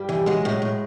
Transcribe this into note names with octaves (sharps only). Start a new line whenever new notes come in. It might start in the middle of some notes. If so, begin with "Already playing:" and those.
Already playing: G2 G3
E3
F#3 G#3
A2
A2